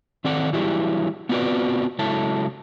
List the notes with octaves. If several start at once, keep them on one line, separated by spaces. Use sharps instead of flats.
D#3 C4 A4 D5 F#5
E3 F#3 G3 E4 G4 G#4
B3 C4 F4 F#4 B4 D5
C#3 F#3 G#3 E4 A4 A5